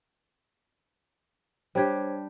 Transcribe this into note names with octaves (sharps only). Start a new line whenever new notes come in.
G3 D4 G4 C5 C#5 G#6